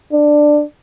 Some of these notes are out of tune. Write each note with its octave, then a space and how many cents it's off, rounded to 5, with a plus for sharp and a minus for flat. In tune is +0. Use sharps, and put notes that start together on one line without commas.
D4 +10